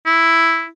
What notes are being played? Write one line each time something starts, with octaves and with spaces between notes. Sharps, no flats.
E4